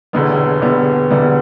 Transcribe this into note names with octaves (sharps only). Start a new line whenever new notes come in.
E1 E2 D3 G3 B3
E1 E2 D3 G3 B3
E1 E2 D3 G3 B3